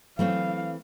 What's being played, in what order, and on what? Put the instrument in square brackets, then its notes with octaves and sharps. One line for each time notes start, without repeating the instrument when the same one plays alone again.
[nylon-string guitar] E3 A3 C4 [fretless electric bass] F#3 [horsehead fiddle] F5